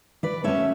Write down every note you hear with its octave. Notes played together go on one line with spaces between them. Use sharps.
B4 D5
D3 F#3 A3 C#4 C#5 E5